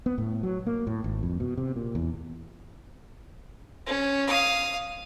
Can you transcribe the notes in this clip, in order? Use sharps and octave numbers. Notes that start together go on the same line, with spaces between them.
B3
A2
F#3
A#3
A2
G#1
F2
B2
C3
A#2
E2
C#4
F5 D#6